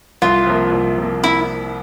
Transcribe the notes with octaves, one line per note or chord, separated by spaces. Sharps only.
C2 F4
C3 F3 A#3
C2
C3 F3 A#3
E4